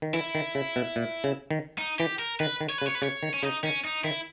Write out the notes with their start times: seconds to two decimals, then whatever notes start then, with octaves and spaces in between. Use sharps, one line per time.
0.02 D#3
0.14 E3 E4
0.35 D#3
0.55 C#3
0.76 B2
0.96 A#2
1.24 C#3
1.51 D#3
1.78 D#4
1.99 E3 G4
2.19 A#4
2.40 D#3 B4
2.61 D#3
2.70 C#5
2.78 C#3 B4
2.87 C#5
2.95 B4
3.02 C#3 C#5
3.23 D#3
3.34 C#4
3.43 C#3 D#4
3.63 D#3 C#4
3.85 D#4
4.04 D#3 E4